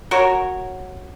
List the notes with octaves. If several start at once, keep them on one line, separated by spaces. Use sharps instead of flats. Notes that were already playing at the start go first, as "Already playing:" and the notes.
F#4 A#4 C#5